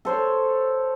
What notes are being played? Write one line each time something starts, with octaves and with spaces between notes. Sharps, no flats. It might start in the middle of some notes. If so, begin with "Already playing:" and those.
A4 C5 C#5